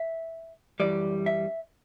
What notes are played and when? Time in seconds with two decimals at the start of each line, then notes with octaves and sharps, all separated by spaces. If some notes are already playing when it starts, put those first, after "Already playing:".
Already playing: E5
0.80 F#2 E3 G3 D5
1.26 E5